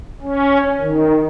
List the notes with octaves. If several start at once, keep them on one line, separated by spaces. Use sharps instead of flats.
C#4
D#3